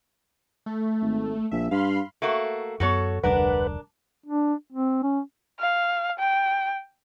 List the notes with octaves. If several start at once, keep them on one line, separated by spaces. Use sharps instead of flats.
A3
G#1
A#1 E5
G2 F5 B5 C6
A3 A#3 F#4
F#2 B3 F#4 A4 C#5
F1 D2 G3 D4 A#4 B4 F#5
D4
C4
C#4
F5
G5